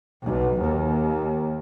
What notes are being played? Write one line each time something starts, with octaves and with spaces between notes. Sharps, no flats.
B1
D#2